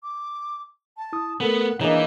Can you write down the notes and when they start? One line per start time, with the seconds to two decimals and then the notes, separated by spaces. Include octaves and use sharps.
0.03 D6
0.97 A5
1.13 E4 D#6
1.40 A3 B3 A4 A#4 F#5
1.81 E3 A#3 D4 D#4 G#4 C#5